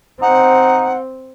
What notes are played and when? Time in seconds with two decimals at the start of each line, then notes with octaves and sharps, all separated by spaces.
0.22 C4 D#4 F#5